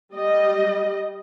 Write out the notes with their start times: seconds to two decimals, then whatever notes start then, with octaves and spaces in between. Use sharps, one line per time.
0.14 G3 D#5